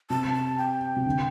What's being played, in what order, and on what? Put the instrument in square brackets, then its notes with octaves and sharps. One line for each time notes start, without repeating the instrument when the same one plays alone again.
[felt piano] C3 [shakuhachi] A5
[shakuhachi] A5
G5
[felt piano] C3
D3